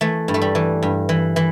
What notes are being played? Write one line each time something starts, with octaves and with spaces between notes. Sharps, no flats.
E3 A3
G2
A3
G3
E3
G2
E3
E3